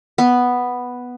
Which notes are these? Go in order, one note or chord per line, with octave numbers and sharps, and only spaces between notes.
B3